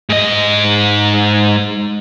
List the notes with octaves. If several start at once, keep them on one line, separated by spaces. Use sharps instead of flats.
G#2 D#5